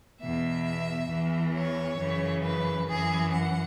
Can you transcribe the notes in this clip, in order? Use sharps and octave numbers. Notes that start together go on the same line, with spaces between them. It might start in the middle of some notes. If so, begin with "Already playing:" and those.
E2 B2 E5
E2 E3
C#5
F#2 C#3 E3
B4
F#2 E3 G#4
F#5